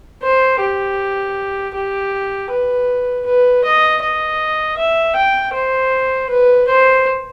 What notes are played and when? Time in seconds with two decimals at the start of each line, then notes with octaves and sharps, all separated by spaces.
0.23 C5
0.61 G4
1.74 G4
2.50 B4
3.26 B4
3.64 D#5
4.02 D#5
4.78 E5
5.16 G5
5.54 C5
6.30 B4
6.68 C5